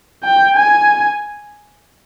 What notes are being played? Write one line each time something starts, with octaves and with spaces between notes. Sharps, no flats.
G5
G#5